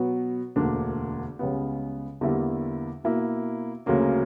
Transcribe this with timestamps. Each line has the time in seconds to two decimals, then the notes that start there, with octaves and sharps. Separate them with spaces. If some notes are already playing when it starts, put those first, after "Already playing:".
Already playing: B2 F#3 B3 F#4
0.56 E1 D2 D3 A#3 D4
1.39 C#2 C#3 G3 B3
2.21 E2 D3 G3 A#3 E4
3.04 B2 A#3 E4
3.86 D2 C#3 F#3 A#3 C#4